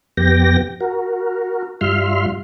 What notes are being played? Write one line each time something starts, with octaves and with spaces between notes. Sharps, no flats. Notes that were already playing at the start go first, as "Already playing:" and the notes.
F2 B3 G4 G5 A#6
F#4 A#4
G2 G3 F4 E5 C6 F6